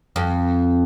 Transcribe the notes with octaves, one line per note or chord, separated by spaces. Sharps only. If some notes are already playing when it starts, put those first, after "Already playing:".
F2